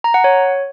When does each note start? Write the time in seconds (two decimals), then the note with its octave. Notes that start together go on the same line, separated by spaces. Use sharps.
0.04 A#5
0.14 F#5
0.24 C#5